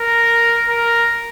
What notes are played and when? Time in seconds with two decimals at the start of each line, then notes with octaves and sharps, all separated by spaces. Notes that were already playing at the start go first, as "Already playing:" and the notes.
Already playing: A#4
0.68 A#4